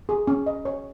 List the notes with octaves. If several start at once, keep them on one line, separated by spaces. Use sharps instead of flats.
G#4
C#4
D#5
C#5